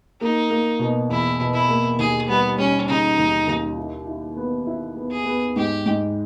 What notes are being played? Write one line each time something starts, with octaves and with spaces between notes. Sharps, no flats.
A#3 D#4
A#3
B2
E2 E4
B2
E4
A#3
D#2 G#4
G3 B3
G3 C#4
C#3 D#4
D#2
D#2
E4
E4
B3
E4
B3
G#4
B3
G#2 G4
G#2